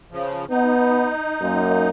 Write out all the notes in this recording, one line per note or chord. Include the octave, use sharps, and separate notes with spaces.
C#3 F3
B3 D#4
F#2 A#3